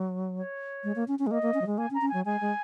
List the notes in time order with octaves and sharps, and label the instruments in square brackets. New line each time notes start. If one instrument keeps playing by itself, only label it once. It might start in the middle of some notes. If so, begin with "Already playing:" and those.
Already playing: [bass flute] F#3
[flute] C#5
[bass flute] G#3
A#3
C#4
C#4
G#3
[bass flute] A#3 [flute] D#5
[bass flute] A#3
C#4
F#3
G#3
[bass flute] A#3 [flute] G#5
[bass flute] C#4
[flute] A#5
[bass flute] C#4
[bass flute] F#3 [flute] G#5
[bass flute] G#3 [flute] G#5
[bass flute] G#3